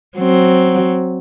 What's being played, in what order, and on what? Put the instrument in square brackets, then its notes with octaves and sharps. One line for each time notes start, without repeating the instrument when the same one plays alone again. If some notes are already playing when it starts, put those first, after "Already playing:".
[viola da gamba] F#3 C4